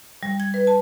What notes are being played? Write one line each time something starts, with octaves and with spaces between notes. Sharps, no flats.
G3
G#6
B4
A5